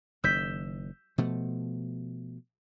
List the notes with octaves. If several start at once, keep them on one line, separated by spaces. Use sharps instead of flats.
F#1 D#3 E6 G6 B6
B2 F3 A3